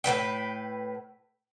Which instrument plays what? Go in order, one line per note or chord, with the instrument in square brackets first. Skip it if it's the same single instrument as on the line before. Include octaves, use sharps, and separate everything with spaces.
[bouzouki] A2 G3 B4 G5